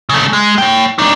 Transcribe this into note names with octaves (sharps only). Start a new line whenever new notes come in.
C#3 A3
G#3
C#5 G5
D4 D#4